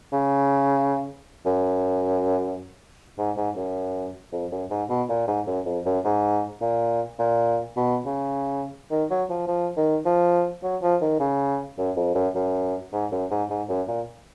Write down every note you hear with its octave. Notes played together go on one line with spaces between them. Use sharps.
C#3
F#2
G#2
G#2
F#2
F2
F#2
G#2
B2
A#2
G#2
F#2
F2
F#2
G#2
A#2
A#2
B2
C#3
D#3
F#3
F3
F3
D#3
F3
F#3
F3
D#3
C#3
F#2
F2
F#2
F#2
G#2
F#2
G#2
G#2
F#2
A#2